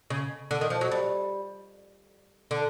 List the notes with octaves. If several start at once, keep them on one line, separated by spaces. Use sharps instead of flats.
C#3
D3
D#3
F3
F#3
G3
D3